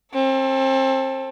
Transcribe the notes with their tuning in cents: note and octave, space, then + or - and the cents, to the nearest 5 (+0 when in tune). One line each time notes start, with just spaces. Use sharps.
C4 +30 A4 +0